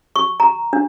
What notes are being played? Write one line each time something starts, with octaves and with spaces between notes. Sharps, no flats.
C#6
A#5
D4